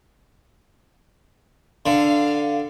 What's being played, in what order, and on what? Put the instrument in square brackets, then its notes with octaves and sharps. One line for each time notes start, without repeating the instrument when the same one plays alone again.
[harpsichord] D3 [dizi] F5